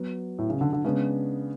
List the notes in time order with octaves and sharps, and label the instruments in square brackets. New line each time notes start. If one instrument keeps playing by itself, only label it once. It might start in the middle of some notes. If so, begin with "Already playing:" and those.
Already playing: [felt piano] F#3 B3 F#4
[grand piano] A2
C#3
D3
D3
[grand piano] C#3 [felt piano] G#3 B3 D4